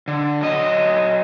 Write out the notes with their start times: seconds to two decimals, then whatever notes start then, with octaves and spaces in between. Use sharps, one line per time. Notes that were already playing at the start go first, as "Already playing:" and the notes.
0.08 D3
0.41 F#3 D#5